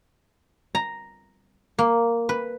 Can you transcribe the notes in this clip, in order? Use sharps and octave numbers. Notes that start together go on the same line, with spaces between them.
A#5
A#3
B4